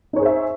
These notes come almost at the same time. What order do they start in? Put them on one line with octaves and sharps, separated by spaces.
D#4 C#5 G#4 C5 E5